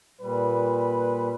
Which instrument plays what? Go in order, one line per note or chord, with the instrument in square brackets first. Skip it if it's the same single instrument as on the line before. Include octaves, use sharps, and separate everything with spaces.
[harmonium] A#2 G3 [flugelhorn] B4